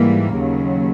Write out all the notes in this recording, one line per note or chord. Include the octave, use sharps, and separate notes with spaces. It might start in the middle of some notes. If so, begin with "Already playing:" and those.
Already playing: G#2 E3 G3 A#3
D#2 C#3 F#3